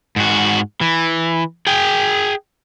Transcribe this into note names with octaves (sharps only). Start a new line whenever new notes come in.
G#2 F#4
E3
G#4 G5